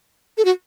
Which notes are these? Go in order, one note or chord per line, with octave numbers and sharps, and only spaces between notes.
A4
F#4